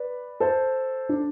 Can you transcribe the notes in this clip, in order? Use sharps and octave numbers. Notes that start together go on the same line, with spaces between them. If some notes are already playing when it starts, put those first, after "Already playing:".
Already playing: B4 D5
A4 C5
D4